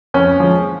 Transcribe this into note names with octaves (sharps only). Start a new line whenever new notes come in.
F2 C#4
F3 G#3